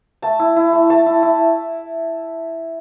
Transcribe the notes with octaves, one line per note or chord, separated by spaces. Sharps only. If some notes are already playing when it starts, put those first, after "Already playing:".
A3 A5
E4
E4
A3
A3 A5
E4
E4